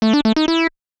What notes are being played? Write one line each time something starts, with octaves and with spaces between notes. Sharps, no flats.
A3
D4
A3
D#4
E4